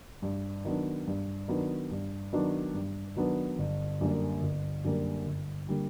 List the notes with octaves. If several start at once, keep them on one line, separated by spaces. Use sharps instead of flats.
G2
D#3 F#3 B3 D4
G2
D#3 F#3 B3 D4
G2
D#3 F#3 B3 D4
G2
D#3 F#3 B3 D4
G1
F#2 D3 G3 A#3
G1
F#2 D3 G3 A#3
G1
D3 G3 A#3